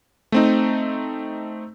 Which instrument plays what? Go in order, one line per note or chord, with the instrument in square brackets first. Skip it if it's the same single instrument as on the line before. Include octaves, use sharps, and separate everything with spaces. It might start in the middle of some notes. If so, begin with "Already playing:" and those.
[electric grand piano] A3 C4 D#4